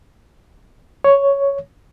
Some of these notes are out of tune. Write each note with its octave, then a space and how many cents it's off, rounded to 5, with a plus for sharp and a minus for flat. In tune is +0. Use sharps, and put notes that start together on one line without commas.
C#5 +5